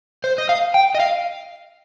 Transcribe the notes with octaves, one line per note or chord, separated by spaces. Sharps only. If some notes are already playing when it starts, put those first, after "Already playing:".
C5
D#5
F5
G5
D#5
F5